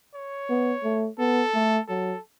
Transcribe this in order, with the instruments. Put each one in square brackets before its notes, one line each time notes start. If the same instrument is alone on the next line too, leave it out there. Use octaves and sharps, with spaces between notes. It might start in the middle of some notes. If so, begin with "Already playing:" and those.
[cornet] C#5
[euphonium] B3
A3
[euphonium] B3 [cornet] A4
[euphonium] A3
[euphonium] F#3 [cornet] A4